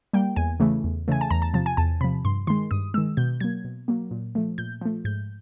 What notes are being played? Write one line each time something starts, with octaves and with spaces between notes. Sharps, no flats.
G3 A#3 G5
E2 G#5
C#3 E3 A3
E2
C#3 E3 A3 G#5
A5
E2 A#5
A5
C3 F3 A5
G#5
E2 A5
C3 F3 B5
G2 C6
D#3 G#3 C6
G2 D#6
D#3 G#3 E6
B2 G6
F#3 A#3 G#6
B2
F#3 A#3
A#2
F3 A3
A#2 G6
F3 A3
G#2 G6